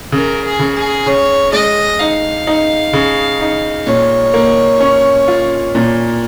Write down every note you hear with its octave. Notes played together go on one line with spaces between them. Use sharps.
C#3 A#4
G#4
C#3
G#4
C#3 C#5
G#3 D#5
D#4 F5
D#4
C#3
D#4
A#2 C#5
A#3
C#4
F4
A#2